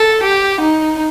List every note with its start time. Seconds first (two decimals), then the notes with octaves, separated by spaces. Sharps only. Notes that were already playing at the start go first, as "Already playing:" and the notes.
Already playing: A4
0.23 G4
0.60 D#4